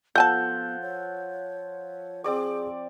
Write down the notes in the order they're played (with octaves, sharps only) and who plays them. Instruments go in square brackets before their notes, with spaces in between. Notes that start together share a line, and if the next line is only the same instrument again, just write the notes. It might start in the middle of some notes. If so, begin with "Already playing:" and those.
[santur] F3 F#5 E6 [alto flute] B3 [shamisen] A4 G#5 A5 [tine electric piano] G6
[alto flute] C#5
[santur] C4 D5 D6 [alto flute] G#4